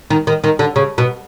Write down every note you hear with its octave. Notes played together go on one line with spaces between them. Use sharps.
D#3
D#3
D#3
D3
C#3
B2